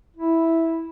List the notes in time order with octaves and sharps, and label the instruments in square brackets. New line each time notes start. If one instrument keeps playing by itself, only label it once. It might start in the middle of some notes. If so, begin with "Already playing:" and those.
[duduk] E4